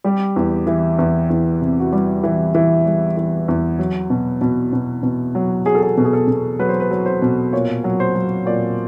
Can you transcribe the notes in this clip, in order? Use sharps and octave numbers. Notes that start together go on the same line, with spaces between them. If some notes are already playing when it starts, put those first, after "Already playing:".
G3 G4
E2
E3
E2
E2
C3
F#4
G3 G4
E3
E3
G3
E3
E2
F#3
B2
B2
B2
B2
F#3
F#3 G#4
A4
G#4
B2
G#4
A4
B2
F#3 B4
C5
B4
F#3
C5
B2
A#2 C#5
F#3
C5
F#3
A#2 D5